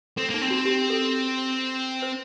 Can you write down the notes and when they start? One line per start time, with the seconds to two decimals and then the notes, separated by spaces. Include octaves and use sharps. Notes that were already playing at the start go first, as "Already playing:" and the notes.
0.17 C4 A4
0.30 A#3 D#4
0.41 C4
0.50 F#4
0.65 G4
0.90 A4
2.02 C5